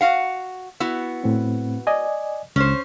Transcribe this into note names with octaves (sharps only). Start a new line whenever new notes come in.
F#4 F5 F#5
B3 E4 F#4
A2 C4
D5 D#5 G#5
C#2 C#4 C5